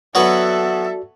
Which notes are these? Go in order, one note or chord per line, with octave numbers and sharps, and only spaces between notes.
F#3 B3 F#4 A4 B4 D5 E5